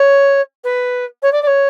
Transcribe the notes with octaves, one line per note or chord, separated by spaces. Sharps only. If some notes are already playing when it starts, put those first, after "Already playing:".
Already playing: C#5
B4
C#5
D5
D5
C#5